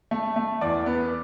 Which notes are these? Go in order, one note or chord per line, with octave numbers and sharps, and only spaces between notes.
A3
A3
E2 D5
B3